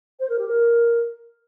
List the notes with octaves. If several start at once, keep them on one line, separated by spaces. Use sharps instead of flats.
C5
A#4
G4
A#4